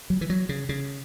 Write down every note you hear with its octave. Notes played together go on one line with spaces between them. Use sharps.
F#3
E3
F#3
C#3
C#3